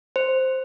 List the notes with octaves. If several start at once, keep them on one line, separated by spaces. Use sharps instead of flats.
C5